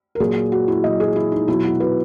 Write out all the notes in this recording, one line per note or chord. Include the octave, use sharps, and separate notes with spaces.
A#4
A#2 F#3 G#4
F#4
E4
A#2 F#3 D#5
G#4
E4
D#4
B2 F#3 E4
F#4
B4